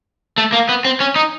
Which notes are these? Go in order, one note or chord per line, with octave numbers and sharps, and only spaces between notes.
A3
A#3
B3
C4
C#4
D#4